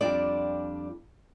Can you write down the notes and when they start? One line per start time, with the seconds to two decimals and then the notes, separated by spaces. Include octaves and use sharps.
0.01 F2 E3 G3 D4 F4 D5